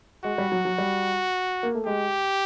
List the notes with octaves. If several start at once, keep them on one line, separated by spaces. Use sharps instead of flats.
G#3 F#4
G3
F#3
F#3
G3
A#3
A3
G#3 G4